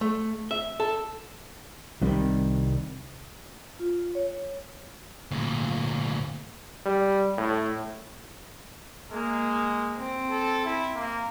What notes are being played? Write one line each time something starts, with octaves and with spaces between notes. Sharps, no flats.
A3
E5
A4
C2 C3 D#3 G3
F4
C#5
D2 A#2
G3
A2
G#3 A#3
C4
A4
E4
A#3